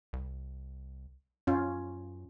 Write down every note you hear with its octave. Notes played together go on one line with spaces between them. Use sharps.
C2
F#2 C#4 F4